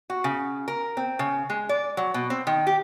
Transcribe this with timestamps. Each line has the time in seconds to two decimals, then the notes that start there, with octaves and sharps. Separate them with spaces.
0.10 F#4
0.24 C#3
0.68 A#4
0.97 C4
1.19 C#3
1.50 G#3
1.69 D5
1.97 F#3
2.14 B2
2.30 C4
2.47 D#3
2.67 G4